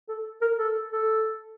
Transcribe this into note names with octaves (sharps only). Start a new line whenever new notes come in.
A4
A#4
A4
A4